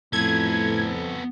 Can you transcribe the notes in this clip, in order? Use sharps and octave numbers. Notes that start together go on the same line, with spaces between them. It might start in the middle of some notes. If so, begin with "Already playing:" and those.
F2 A2 B3 A4 G#6